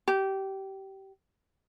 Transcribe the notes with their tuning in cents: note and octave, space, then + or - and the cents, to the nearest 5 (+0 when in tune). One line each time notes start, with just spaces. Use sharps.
G4 -20